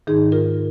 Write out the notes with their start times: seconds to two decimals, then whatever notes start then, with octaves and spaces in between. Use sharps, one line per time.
0.07 G#2 D#3 D#4 G#4
0.32 F4 A#4